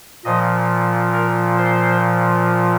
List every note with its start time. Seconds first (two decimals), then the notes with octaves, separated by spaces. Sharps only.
0.25 A#2 F3 D#5
1.13 A#4
1.57 C5